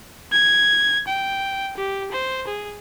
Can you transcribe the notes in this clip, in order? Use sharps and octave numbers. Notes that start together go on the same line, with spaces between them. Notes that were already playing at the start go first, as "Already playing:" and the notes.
G#6
G5
G4
C5
G#4